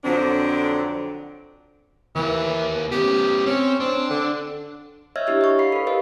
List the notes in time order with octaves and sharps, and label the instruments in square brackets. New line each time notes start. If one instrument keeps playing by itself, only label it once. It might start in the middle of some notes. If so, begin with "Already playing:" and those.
[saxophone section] F2 D3 F#3 C4 D4
[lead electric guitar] D#2 A#3 [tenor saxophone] E3
[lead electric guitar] B3 C#4 [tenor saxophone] G4
[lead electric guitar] C4 [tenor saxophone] C#4
[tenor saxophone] C4 [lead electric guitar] D4
[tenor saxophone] D3
[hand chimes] C#5 D#5 E5 E6 F6 G#6
D4 E4 G4 C#5
D#5 C#6
F5 B5 C7
A4 B4
G4 A#4 C5 D#5 F5